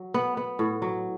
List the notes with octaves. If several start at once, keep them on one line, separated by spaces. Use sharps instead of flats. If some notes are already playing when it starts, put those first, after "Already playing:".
Already playing: F#3
B3
B3
A2
F#3